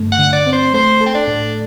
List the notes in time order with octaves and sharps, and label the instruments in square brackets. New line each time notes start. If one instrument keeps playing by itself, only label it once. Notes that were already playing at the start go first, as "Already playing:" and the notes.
Already playing: [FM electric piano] G2 D3 A3
[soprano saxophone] F#5
[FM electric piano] D3
[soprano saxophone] D5
[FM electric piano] C4
[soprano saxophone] C5
[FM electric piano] A3 [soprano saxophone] C5
[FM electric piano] A4
[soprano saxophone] C4
D4
[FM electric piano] A2